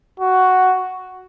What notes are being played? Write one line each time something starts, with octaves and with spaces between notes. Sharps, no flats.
F#4